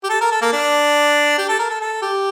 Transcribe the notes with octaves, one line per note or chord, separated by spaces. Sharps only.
G4
A4
A#4
A4
A#3
D4
G4
A4
A#4
A4
A4
G4